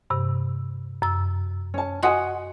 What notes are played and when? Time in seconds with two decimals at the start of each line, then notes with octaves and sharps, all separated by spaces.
0.10 G2 C3
1.02 F#2 E6
1.74 C#4 A5
2.03 F#4 D#5 F#5 G#5 C6 D#6